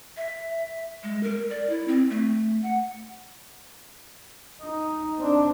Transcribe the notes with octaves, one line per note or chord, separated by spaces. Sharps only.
E5
G#3
A#4
D5
E4
C4
A3
F#5
D#4
C4 D4